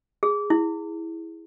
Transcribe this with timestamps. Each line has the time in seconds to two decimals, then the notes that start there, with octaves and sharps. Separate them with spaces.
0.23 G#4
0.50 E4